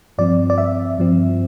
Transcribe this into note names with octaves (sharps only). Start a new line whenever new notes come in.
G2 F3 C4 D5
D5
E5
G2 F3 C4